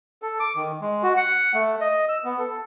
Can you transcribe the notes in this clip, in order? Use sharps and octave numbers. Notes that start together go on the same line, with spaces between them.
A4
D6
D#3
G#3
F#4
F#5
A3
D#5
E6
B3
A4